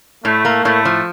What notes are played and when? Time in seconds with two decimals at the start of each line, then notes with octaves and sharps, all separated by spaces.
0.24 A2 A3
0.45 A#3
0.64 A2 A3
0.85 F3